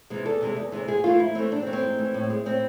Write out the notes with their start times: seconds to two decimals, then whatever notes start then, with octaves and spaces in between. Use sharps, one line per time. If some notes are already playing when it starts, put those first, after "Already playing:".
0.10 C3 E3 G#3
0.26 E2 A4
0.41 C3 E3 G#3
0.57 E2
0.72 C3 E3 G#3
0.88 G#2 G#4
1.04 E3 A3 F4
1.19 G#2 E4
1.35 E3 A3 C4
1.51 G#2 D4
1.62 C4
1.67 E3 A3
1.73 C4
1.83 G#2
1.99 E3 A3
2.14 A2
2.30 G#3
2.46 A2 C4